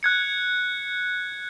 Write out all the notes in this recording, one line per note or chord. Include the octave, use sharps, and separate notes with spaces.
F#6 G#6 C#7